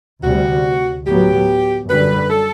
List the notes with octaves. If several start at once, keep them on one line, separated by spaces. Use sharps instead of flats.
D2 C3 G3 F#4
A2 F#3 B3 G4
F#2 D3 G3 B4
A4